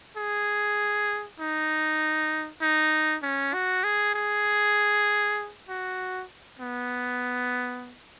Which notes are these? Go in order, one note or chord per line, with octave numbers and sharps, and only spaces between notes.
G#4
D#4
D#4
C#4
F#4
G#4
G#4
F#4
B3